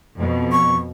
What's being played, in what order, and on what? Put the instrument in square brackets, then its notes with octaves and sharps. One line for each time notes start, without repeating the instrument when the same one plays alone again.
[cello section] F2 B2
[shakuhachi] C#6